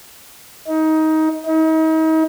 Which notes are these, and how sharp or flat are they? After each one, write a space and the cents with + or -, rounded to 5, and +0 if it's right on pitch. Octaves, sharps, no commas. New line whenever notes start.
D#4 +20
D#4 +40